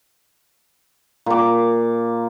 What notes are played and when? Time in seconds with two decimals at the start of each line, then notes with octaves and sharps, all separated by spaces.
1.26 A#2 D6